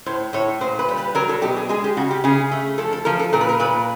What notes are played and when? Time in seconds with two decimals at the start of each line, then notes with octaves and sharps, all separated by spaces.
0.06 A2 C5
0.33 A2 C#5
0.61 A#2 C5
0.79 B4
0.88 G3
0.98 B4
1.15 F#3 A#4
1.29 A4
1.42 B2 G4
1.56 G#4
1.69 G#3 G#4
1.84 G4
1.97 C#3 F#4
2.11 G4
2.24 C#3 G#4
2.52 A3
2.78 F3 A4
2.93 A4
3.05 F3 A#4
3.19 A4
3.33 A#2 A#4
3.41 B4
3.49 A#4
3.60 A#2 B4